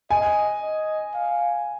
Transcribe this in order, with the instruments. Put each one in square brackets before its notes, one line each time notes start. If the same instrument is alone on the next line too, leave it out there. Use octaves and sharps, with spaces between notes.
[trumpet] D#5 [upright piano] G#5
[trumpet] D#5
F5